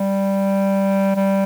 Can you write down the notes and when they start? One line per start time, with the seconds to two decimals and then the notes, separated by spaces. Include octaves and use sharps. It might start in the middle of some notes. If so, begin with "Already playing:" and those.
Already playing: G3
1.16 G3